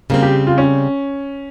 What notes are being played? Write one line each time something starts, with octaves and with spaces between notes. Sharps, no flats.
C#3 G3 A#3 C4
G4
F4
C#4